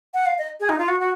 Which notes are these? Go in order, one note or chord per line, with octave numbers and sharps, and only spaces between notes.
F#5
F5
D#5
G#4
D#4
F4
F#4
F#4